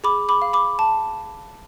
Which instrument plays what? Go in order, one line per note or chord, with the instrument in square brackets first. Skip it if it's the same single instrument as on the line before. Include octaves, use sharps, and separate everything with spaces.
[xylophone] G#4 B5 D6
B5 D6
F5
B5 D6
A5